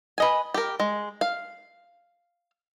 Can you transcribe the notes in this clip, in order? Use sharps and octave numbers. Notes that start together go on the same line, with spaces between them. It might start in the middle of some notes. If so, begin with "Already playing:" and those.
B4 D#5 G#5
G4 A#4
G#3
F5